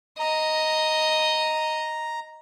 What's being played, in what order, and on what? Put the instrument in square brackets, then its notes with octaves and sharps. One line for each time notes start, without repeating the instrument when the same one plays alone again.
[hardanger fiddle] D#5 [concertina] A#5